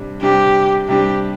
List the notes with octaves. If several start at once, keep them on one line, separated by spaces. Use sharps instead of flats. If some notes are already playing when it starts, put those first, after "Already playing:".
Already playing: C3 G3 D4
C3 G3 D4 G4
C3 G3 D4 G4